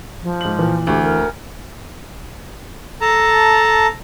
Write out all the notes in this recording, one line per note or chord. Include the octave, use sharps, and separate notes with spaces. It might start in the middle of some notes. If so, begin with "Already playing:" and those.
F3
G#2 F#7
A#2 E3
D2 G4
A#4
A4 A5 A#5